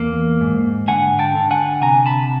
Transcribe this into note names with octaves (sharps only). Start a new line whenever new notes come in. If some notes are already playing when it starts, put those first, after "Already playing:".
Already playing: E2 A#3
G#2
D3 F#5 G#5
G5 A5
D3
F#5 G#5
C3 G#5 A#5
A5 B5